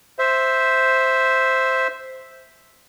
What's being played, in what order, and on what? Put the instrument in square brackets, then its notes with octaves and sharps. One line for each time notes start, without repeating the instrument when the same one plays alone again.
[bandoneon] C5 E5